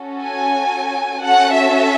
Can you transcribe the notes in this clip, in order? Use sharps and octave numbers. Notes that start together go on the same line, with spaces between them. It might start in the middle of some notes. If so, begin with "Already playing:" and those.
Already playing: C#4 F#4 A4
G#5
C#4 F#4 A4 F#5
E5